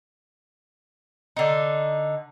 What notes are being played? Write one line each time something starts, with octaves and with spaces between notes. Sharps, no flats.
D3 D#4